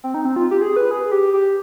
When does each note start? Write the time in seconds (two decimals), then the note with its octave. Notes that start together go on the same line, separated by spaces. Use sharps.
0.04 C4
0.14 D#4
0.25 C4
0.36 F4
0.51 G4
0.61 G#4
0.76 B4
0.91 G#4
1.12 G4
1.34 G4